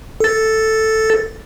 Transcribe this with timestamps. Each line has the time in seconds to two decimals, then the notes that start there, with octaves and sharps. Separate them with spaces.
0.20 A4 A6